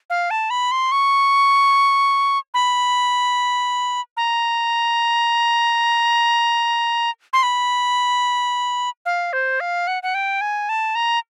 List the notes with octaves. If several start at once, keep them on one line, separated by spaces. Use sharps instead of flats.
F5
A5
B5
C6
C#6
B5
A#5
C6
B5
F5
C5
F5
F#5
F#5
G5
G#5
A5
A#5